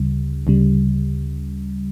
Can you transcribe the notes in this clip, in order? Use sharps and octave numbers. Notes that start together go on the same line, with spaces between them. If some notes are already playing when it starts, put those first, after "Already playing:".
Already playing: D2 C#3 G3
D2 C#3 G3